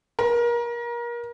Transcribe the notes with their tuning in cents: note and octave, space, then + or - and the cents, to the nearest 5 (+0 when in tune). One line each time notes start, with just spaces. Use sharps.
A#4 +30